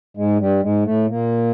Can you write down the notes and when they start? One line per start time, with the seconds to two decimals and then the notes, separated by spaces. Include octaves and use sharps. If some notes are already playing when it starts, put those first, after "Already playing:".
0.17 G#2 G#3
0.40 G2 G3
0.63 G#2 G#3
0.85 A2 A3
1.09 A#2 A#3